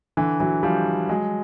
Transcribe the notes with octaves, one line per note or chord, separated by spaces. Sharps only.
D3 E3
E3 F#3
F3 G3
F#3 G#3